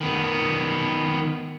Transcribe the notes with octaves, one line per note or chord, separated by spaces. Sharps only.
D#3 B3